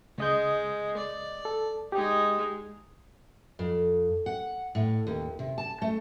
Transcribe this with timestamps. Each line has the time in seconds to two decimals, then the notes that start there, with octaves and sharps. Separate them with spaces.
0.18 C#2 G#3 D#5 G6
0.97 D5
1.45 A4
1.92 G#3 D#4 G4
3.59 F2
4.26 F#5
4.75 A2
5.07 D#2
5.39 C3
5.58 A5
5.82 A3